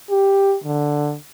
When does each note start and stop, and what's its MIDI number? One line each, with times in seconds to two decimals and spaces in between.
0.10 0.56 67
0.64 1.15 50